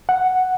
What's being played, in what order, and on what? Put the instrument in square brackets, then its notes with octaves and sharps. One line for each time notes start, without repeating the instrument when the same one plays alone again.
[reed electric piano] F#5